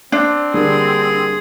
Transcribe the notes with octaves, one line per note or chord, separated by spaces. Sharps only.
C4 D4
D3 G3 A#3 G#4